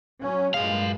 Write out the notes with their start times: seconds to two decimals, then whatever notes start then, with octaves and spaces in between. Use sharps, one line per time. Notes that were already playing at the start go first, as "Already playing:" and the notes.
0.20 F#3 C#4
0.54 G2 A#2 F#3 G#3 F5